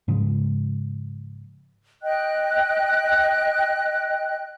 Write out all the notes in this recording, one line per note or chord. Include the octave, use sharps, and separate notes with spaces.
G#2 C#3 F3 G#3
D#5 G5 F#6